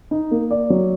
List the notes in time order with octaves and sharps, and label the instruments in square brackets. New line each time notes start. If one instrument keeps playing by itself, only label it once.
[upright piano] D#4
A#3
D5
F#3